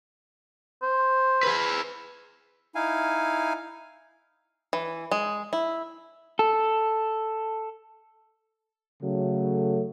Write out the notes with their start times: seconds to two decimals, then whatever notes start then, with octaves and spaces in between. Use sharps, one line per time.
0.82 C5
1.43 G#4 B4
2.75 D#4 E4 F5 G#5
4.73 E3
5.11 G#3
5.53 E4
6.39 A4
9.02 C#3 F#3 A3